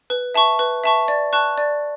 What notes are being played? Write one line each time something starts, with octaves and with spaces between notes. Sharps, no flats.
B4
E5 A5 C#6
B4
E5 A5 C#6
D5
A5 C#6 F#6
D5